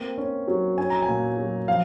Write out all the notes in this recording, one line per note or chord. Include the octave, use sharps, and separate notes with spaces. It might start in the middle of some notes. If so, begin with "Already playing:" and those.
Already playing: A#3 C4
C#4
F#3
C#4 G#5
A#5
G#5
A#2
F#3
F3 F5